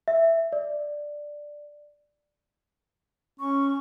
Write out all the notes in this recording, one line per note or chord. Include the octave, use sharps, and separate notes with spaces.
E5
D5
C#4 C#6